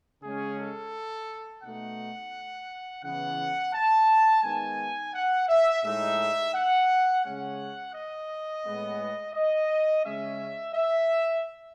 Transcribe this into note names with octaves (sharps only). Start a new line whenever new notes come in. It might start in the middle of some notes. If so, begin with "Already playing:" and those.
C#3 G#3 C#4 G#4
A4
B2 A3 D#4 F#5
C#3 E3 B3 F#5
A5
D#3 G#3 B3 D#4 G#5
F#5
E5
A2 G#3 D#4 E5
F#5
C#3 G#3 C#4 F#5
D#5
A2 G#3 B3
D#5
C#3 G#3 C#4 E5
E5